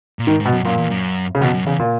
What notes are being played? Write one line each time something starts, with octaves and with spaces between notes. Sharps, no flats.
A#2
G#2 D#3
G#2
B2
F#2
F#2 A#2
E2
F#2
C#3
E2 B2
F#2
E2 C#3
A#2